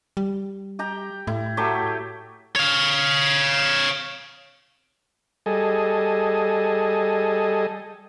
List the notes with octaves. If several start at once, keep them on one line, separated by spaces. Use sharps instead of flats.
G3
G4 G5 A#5
A2 E4
F#3 A3 G4
C#5 F5
G3 G#4 A4 D#5